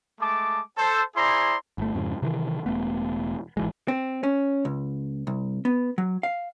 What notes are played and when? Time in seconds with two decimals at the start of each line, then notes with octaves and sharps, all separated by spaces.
0.21 G#3 A3 A5 D6
0.78 A4 C5
1.16 E4 G#4 C5 D5 A#5 C6
1.78 G1 A3
1.95 F2 G#2 C#3
2.22 C3 D#3 E3
2.66 E1 A3 B3
3.57 G#1 E3 G#3
3.88 C4
4.23 C#4
4.65 C#2
5.27 C2
5.65 B3
5.98 F#3
6.23 F5